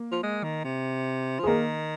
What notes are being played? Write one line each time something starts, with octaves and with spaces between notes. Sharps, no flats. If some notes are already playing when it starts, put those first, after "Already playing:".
Already playing: A#3
F3
G#3
D#3
C3
F3
G#4
D#3 A#3 A#4